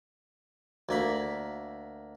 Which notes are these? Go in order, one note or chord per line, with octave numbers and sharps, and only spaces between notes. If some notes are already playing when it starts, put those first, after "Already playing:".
D2 A#3 B5